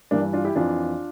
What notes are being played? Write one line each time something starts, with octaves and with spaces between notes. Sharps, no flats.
G2 E3 A#3 D4
D4 F4
E4 G4
F2 E3 D4 F4